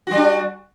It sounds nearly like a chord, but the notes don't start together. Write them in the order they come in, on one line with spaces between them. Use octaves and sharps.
F#4 G3 D4